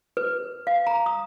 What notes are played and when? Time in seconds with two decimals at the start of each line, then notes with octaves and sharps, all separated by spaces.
0.17 B4
0.67 F5
0.87 A#5
1.06 D#6